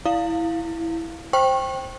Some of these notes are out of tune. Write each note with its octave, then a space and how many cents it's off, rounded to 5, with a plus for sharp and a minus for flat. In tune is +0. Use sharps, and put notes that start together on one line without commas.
E4 +0 F5 +0
C5 +10 G5 +0 C#6 -30